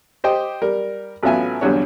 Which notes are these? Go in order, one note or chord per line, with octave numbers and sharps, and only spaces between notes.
G4 C5 D#5 G5
G3 A#4
A1 F#3 B3 F4 E5 G#5
E2 G2 D3 F#3 F#4 C#5